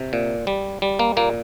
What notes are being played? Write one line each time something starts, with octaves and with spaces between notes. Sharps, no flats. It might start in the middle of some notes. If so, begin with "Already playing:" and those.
Already playing: C3
A#2
G3
G3
A#3
A#2 A#3